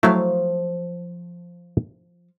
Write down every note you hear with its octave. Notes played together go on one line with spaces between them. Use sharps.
F3 F#3 A3 E4 F5